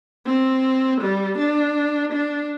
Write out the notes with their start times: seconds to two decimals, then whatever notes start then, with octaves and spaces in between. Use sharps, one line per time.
0.26 C4
1.01 G3
1.38 D4
2.12 D4